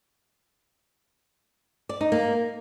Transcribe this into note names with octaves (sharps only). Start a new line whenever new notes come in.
D5
D#4
A#3